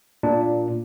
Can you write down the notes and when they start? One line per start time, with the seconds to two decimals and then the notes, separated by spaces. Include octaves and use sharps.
0.23 A#2 D4